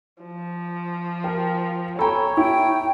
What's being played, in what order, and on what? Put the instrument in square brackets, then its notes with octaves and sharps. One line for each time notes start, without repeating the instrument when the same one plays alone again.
[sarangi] F3
[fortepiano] A#4 [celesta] G5
[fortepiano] A4 G5 [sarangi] C#5 [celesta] G#5 A#5 B5
[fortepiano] E4 [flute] G5